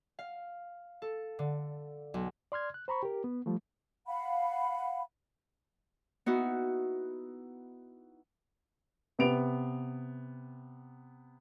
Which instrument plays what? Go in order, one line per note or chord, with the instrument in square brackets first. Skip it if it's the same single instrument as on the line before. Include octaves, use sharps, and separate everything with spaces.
[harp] F5
A4
D3
B1
[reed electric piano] D5 C6 F6 G#6
F#6
C5 A#5 B5 C#6
G4 A#4
B3
F3 G3 A3
[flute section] F5 F#5 B5
[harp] B3 D#4 E4 F#4
[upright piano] C3 B3 D7 F7